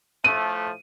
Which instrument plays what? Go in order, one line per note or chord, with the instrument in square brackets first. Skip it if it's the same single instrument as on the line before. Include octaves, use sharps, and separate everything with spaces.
[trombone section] A2 F3 A3 [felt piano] D#7